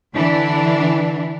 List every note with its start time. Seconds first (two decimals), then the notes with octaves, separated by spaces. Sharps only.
0.15 D3 E3 D4